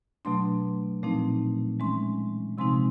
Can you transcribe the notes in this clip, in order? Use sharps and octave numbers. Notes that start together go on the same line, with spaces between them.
B2 F#3 A3 D4 C6
A#2 F3 A3 C4 D#4
E3 G#3 C#4 C6
C3 F3 G#3 C4 D#4 C6